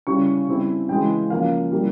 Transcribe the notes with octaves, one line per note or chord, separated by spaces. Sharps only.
C#3 G3 C#4 E4 C#6
C#3 G3 C4 E4
C#3 E3 G#3 E4 G5
C#3 F3 A#3 C#4 F5
C#3 G3 A#3 E4